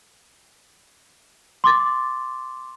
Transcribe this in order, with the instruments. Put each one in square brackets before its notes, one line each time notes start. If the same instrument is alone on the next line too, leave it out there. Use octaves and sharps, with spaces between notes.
[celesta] C6 D6 A6